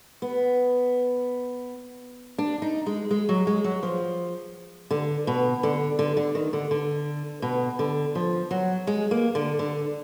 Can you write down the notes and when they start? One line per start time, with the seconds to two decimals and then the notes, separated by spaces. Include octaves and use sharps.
0.22 B3
2.38 D4
2.62 D#4
2.86 G#3
3.11 G#3
3.29 F#3
3.47 G#3
3.64 F#3
3.83 F3
4.91 D3
5.27 B2
5.63 D3
5.99 D3
6.17 D3
6.35 D#3
6.53 D3
6.71 D3
7.42 B2
7.79 D3
8.15 F3
8.51 F#3
8.87 G#3
9.11 A#3
9.35 D3
9.59 D3